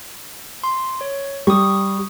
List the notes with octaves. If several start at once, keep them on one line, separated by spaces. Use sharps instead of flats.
C6
C#5
G3 C#6 D#6